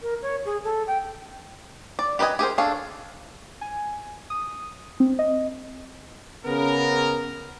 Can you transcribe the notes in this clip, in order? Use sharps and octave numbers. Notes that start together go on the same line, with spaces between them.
A#4
C#5
G#4
A4
G5
D5
G4 B4 C5 D#5 G#5
G4 G#4 A#4 C5
D4 G#4 A4 C#5 F5
G#5
D#6
C4
D#5
C#3 B3 A#4